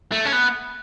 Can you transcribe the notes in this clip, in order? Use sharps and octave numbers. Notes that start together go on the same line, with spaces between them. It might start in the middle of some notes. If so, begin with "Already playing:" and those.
A3
C#4
B3